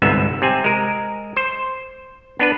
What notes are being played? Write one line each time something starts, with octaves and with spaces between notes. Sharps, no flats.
G1 C2 G#2 B3 E5
C3 C4 G#5
G#3 A#4
C5
B3 D4 B4